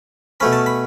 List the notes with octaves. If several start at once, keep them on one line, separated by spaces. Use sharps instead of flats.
B2 A3 C#4 B5
A5
B5